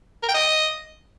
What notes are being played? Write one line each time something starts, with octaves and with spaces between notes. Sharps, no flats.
A#4
G5
D#5